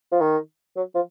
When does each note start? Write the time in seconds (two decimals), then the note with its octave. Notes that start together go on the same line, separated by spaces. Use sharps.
0.12 F3
0.20 D#3
0.76 F#3
0.95 F3